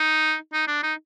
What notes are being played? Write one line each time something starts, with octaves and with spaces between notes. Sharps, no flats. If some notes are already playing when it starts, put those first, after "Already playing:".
Already playing: D#4
D#4
D4
D#4